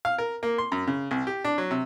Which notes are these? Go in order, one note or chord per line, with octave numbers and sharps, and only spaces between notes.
F5
A#4
A#3
C6
F#2
C#3
C2
G4
D4
F#3
C3